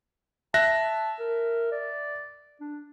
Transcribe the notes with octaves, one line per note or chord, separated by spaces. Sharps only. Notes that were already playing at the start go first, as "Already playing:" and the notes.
E5 A5 F#6 A#6
A#4
D5
D4